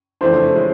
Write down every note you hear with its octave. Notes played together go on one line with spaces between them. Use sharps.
F2 C#3 E3 A3 D4 C5
G#3 C#4 E4